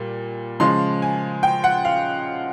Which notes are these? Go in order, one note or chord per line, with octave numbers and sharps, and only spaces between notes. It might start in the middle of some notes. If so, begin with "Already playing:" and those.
Already playing: A#2 G3
C#3 F3 G#3 C6
G#5
G5
F#5
F5